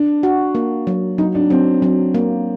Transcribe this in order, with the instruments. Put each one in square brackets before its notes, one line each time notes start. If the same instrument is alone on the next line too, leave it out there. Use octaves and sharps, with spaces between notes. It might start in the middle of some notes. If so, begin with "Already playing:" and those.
Already playing: [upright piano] D4
[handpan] F#4
A#3
F#3
[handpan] F#3 [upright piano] D#4
[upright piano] D4
[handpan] F#3 [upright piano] C4
[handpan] F#3
A#3